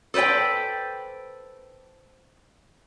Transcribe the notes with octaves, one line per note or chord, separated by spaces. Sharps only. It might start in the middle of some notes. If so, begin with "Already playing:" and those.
A4 B4 C5 D5 G5